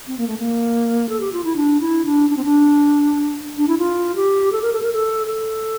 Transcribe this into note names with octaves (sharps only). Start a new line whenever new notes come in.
C4
A#3
A3
A#3
A4
G4
F4
E4
D4
E4
D4
D4
C4
D4
D4
E4
F4
G4
A4
A#4
A4
A#4
A4
A4